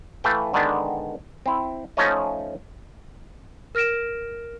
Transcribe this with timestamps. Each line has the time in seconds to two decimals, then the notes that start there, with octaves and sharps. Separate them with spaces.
0.24 E3 A3 B4 E5 F5 G5
0.54 D3 D#3 G#3 B3 D4
1.46 C4 E4
1.97 F3 A3 C#4 D#4 C#5 D#5
3.75 A#4 F6 A#6 D7 E7